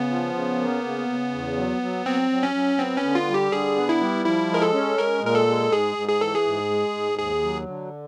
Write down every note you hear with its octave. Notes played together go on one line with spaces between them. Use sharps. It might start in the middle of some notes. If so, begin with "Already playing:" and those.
Already playing: C#3 B3
F3
C#3
A#3
C#3
C#3
E2
F#3
F#3
F#3 C4
F#3
C#4
F#3
B3 C4
C#4
D3
F4
G3
G4
D3 G#4
B3
E4
G3
F3 E4
G#3 A#4
A4
C#4
G#3 A#4
A#2 A#4
A4
G#3
G#2 G#4
G#2
G#4
E3 A4
G#4
G#2
G#3
G#2
D#2 G#4
F#3
D3